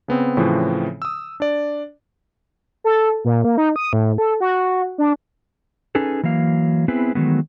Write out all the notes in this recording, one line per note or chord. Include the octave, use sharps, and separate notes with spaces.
C#3 B3 C4
A2 C#3 E3 F3 C4
D#6 E6
D4 D5
A4
A#2
A#3
D#4
D#6
A2
A4
F#4
D4
C#4 D#4 G#4 A4 B4
E3 F#3 A#3 F5
B3 C4 E4 G#4 B4
D#3 E3 F#3 G#3 A3 B3